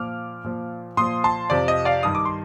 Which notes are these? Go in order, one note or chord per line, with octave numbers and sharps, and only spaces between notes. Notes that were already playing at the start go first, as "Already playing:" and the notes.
Already playing: A#2 F3 D6 F6
A#2 F3
A#2 F3 C6 D#6
A5 C6
F2 C3 F3 D5
D#5
D5 F5
G2 D#3 D#6
D6
C6